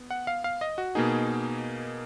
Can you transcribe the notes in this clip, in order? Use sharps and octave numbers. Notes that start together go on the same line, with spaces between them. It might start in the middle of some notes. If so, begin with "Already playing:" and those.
Already playing: B3
F#5
F5
F5
D#5
F#4
B2 A#3 D#4 G#4